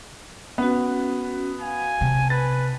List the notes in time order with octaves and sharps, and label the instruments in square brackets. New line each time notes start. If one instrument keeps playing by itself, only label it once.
[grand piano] B3 [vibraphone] C#4 F#4
[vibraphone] F5 [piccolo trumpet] G#5
[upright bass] C3 [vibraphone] G5 A5
[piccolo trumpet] B4 [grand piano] A6